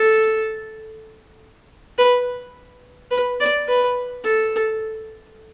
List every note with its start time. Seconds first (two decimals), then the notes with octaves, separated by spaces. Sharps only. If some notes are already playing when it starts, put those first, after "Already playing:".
Already playing: A4
1.98 B4
3.11 B4
3.40 D5
3.68 B4
4.24 A4